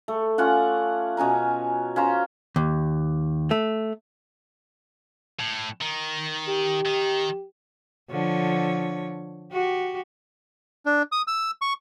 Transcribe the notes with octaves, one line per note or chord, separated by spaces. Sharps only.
A3
C#4 F4 D5 F#5
B2 C#4 G#5 A#5
C#4 F4 C5 A#5
D#2
A3
A2
D#3
G4
D#3
D3 F3 C#5
F#4 G4
D4
D#6
E6
C#6